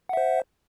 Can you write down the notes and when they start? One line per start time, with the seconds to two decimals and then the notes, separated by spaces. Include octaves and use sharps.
0.09 F#5
0.13 E5
0.17 C5